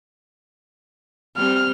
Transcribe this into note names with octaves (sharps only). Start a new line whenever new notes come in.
G3 C4 F6